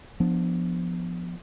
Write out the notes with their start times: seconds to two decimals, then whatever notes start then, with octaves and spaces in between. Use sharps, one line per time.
0.20 F3 B3 D4